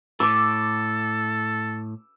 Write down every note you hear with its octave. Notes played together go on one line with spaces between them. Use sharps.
A2 A4 D6 E6